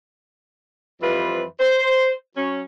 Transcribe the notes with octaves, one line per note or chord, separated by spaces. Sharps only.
F2 E3 G3 F4 B4 C5
C5
F#3 C#4